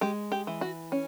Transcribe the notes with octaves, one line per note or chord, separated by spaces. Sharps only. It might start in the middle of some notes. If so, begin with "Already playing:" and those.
G#3 G4
G4
E3
F#4
C#4